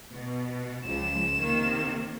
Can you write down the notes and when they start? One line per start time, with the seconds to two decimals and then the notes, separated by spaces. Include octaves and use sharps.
0.13 B2
0.85 C#2 F3 E7
1.38 C3 D#3 A#3